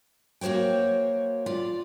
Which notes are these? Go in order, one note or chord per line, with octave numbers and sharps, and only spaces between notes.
A#3 F#4 C5 C#5 G5
F4 D5